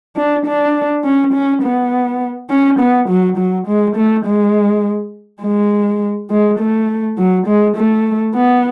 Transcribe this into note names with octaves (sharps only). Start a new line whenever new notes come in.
D4
D4
C#4
C#4
B3
C#4
B3
F#3
F#3
G#3
A3
G#3
G#3
G#3
A3
F#3
G#3
A3
B3